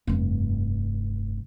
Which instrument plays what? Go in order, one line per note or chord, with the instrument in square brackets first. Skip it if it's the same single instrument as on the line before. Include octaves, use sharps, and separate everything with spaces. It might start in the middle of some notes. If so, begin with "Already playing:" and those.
[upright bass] F1 G2